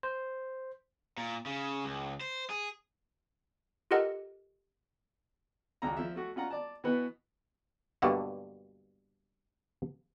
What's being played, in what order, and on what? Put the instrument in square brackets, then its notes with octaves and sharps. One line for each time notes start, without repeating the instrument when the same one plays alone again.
[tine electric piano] C5
[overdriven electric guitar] A#2
C#3
C#2
C5
G#4
[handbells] F4 G4 A4 A#4 D#5 F#5
[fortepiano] G#1 C#2 A#5
F3 E5
A3 F#4
C#4 F4 F#5 A#5
D5 A5
B2 E3 B3 B4
[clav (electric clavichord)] G2 B2 D3 F#3 A3 A#3